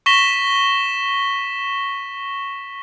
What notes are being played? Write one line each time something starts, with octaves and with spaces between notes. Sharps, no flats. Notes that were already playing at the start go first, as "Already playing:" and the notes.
C#6 A#6 B6 E7 G7